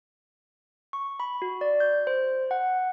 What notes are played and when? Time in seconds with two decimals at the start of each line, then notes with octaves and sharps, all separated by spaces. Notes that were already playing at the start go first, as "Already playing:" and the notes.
0.93 C#6
1.20 B5
1.42 F#4
1.61 D5
1.80 G6
2.07 C5
2.51 F#5